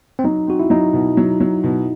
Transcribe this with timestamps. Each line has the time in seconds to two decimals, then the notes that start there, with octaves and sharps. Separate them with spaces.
0.19 C4
0.24 F#3 D#4
0.47 C4 F#4
0.60 E4
0.70 F#3 D#4
0.93 B2
1.17 F#3
1.40 F#3
1.64 B2